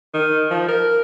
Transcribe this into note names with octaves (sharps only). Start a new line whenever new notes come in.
D#3
F3
A#4